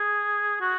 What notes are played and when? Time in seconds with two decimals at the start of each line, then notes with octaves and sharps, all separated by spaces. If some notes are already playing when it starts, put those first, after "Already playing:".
Already playing: G#4
0.61 F#4